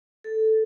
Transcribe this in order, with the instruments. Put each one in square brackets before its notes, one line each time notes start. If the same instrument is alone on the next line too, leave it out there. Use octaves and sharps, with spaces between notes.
[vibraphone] A4